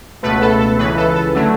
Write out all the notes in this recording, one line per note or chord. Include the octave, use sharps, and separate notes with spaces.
C#2 B2 A3 B4
A4
A4
C#2 C#3 E3 B4
A4
A4
D3 F#3 A3